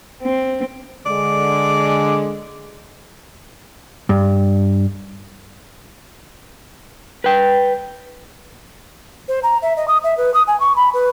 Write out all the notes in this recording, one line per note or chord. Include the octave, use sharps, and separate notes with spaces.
C4
D3 G#3 D5
G2
B4 G5
C5
A#5
E5
D#5
D#6
E5
B4
D#6
G#5
C#6
B5
B4